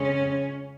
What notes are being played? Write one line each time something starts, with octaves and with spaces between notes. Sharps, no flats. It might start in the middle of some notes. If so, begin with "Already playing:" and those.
Already playing: F2 C#3 G#3 C#4